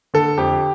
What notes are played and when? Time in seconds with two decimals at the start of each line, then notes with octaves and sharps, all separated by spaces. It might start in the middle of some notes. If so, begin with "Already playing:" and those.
0.14 D3 A4
0.38 F2 G4